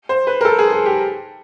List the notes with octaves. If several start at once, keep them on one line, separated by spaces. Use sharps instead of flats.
C5
B4
A#4
A4
G#4
G#4
G4